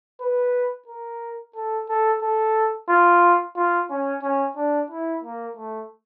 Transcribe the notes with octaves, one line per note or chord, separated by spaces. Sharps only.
B4
A#4
A4
A4
A4
F4
F4
C#4
C#4
D4
E4
A#3
A3